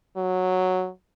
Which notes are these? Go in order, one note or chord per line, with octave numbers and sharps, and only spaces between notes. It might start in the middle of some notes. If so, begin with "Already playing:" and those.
F#3